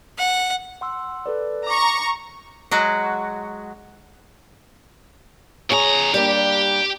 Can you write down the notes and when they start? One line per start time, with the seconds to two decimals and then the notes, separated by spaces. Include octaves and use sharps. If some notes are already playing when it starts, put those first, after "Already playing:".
0.18 F#5
0.81 F#5 C6 E6
1.26 A4 B4 D5
1.67 A#5 C#6 D6
2.71 F#3 G#3 F#4
5.70 F2 G#4 C#5 A#5
6.14 G3 A#3 D4 G4